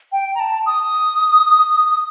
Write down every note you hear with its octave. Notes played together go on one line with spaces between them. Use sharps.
G5
A#5
A5
D#6